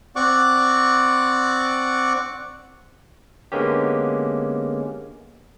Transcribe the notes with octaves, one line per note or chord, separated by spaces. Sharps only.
C4 D5 F#5 C#6 D6
D3 G#3 A#3 B3 C#4 G4